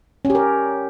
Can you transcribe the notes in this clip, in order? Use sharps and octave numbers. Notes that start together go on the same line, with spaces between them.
C#4
G4
A#4